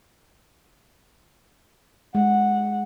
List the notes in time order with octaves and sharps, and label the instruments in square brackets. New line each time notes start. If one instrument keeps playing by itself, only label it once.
[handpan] G#3 [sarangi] F#5